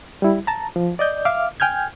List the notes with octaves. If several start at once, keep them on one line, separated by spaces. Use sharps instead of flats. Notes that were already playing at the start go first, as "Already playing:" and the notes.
G3 E4
A5 A#5
F3
D5 D#5 G6
E5 F5 D6 F6
G5 G#5 F6 G6 G#6